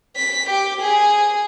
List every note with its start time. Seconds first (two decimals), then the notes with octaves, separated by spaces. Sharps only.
0.17 B6
0.50 G4
0.81 G#4